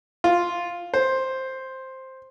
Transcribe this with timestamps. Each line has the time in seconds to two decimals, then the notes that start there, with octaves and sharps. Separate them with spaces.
0.24 F4
0.94 C5